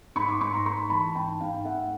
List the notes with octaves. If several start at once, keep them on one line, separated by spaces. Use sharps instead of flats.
G#2 B5 C#6
C6 D6
G#2 B5 C#6
A#5 C6
A3 B5 C#6
E3 A5 B5
G#2 G5 A5
G#2 F5 G5
A3 E5 F#5